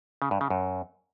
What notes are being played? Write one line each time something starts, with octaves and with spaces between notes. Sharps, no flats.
C#3
G2
C#3
F#2